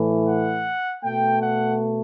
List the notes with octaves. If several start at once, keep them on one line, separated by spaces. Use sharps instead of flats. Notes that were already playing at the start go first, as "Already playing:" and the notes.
Already playing: A2 E3 A3
F#5
B2 A3 G5
F#5